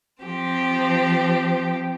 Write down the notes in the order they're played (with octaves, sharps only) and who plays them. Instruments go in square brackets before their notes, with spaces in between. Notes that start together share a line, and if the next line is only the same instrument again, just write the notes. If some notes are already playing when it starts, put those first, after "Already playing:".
[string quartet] F3 C4 G4